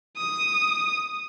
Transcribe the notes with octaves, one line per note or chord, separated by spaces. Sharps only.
D#6